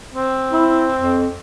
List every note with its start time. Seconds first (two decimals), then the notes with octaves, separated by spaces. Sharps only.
0.14 C4
0.51 E4
0.96 F2